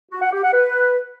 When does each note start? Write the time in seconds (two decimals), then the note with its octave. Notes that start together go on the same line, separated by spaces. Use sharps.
0.11 F#4
0.22 F#5
0.32 G4
0.43 F#5
0.53 B4